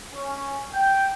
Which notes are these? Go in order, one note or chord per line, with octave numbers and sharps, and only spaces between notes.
C#4
G5